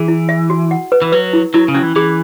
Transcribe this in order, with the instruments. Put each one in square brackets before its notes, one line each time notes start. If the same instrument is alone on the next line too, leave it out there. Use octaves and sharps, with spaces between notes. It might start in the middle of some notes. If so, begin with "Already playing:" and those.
Already playing: [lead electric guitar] E3 [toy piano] G#4
[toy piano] E4
E5
F#4
F#5
B4
[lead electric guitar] E3
[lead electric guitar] F#3 [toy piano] B4
[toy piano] E4
[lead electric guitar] F#3 [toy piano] E4
[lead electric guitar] C#3
[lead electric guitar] F#3 [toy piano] C#4
[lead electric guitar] E3
[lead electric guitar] E3 [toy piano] G#4